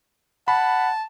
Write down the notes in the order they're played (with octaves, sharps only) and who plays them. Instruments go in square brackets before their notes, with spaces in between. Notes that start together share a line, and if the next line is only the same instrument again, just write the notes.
[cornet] F#5 [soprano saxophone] A5 [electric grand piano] B5